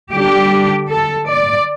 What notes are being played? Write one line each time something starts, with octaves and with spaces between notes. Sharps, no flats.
D3 G3 D4 G4
A4
D5